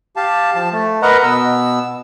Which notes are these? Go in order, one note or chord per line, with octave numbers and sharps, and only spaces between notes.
G4 F5 A5
F3 A5
A3
A#4 B4 D#5 F#5 A#5
B2 B3 E6